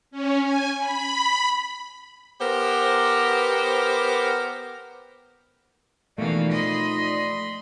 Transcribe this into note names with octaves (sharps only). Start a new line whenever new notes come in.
C#4
G#5
B5
B3 G4 A#4 C5
B2 E3 F3 A3 A#3 D#4 D5 F5
D#5 B5 C6